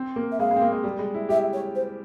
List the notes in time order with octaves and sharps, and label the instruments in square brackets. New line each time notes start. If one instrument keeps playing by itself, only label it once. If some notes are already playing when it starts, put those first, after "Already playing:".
Already playing: [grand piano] C4
A#3
[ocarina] E5
[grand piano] G#3 [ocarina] F5
[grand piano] G#3
C4
A#3
G#3
G3
G#3
E4
[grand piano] G4 [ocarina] E5
[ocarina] C#5
C5